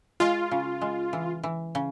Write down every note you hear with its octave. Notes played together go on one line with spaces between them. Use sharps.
G#3 F4
C#3
G#3
E3
E3
C#3